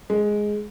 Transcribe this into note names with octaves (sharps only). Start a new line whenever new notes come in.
G#3